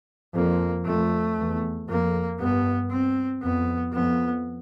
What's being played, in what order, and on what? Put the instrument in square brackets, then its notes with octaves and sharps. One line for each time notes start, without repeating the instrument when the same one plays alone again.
[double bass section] F2 [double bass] A#3
[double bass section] F2 [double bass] A3
[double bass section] E2
[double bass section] F2 [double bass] A#3
[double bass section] G2 [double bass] B3
[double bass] C4
[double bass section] F2 [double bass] B3
[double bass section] F2 [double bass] B3